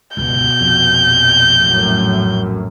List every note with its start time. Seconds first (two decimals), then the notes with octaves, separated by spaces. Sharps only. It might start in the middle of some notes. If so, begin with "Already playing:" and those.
0.17 D1 G1 C#2 B2 G6
0.61 A#1 F2
1.61 F#2 A2